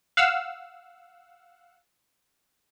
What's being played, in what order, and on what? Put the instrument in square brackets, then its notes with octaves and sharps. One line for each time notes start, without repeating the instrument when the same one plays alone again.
[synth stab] F5 F#5 E6